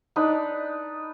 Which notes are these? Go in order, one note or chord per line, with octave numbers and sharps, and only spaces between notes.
D4 D#4 B4